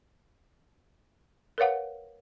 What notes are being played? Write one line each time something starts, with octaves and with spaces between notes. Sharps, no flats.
A#4 B4 C#5 F5 F#5